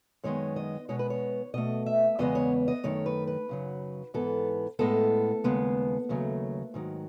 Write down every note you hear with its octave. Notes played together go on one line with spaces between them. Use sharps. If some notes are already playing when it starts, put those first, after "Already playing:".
F#2 D#3 G#3 B3 C#5
D#5
B2 G#3 B3 C#5
B4
C#5
B2 A3 D#5
E5
E2 C#3 G#3 B3 D#5
C#5
D#5
F#2 D#3 A3 C#5
B4
B4
F#2 C#3 F#3
G#2 E3 B3 A4
A2 G#3 B3 A4
D#2 C#3 G#3 B3
D#2 C#3 F#3 A3
G#2 D#3 F#3